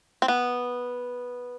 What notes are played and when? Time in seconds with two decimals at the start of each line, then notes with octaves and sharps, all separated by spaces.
0.22 C4
0.28 B3